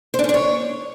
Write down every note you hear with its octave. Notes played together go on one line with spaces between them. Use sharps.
C5
D4
C#4
D4
C#5